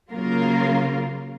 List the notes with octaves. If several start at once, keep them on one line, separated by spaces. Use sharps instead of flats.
C#3 F#3 A#3 F4 A#4